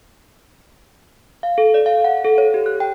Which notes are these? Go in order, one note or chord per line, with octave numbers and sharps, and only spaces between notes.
F5
A4
D5
F5
F#5
A4
C#5
G4
F#6
G5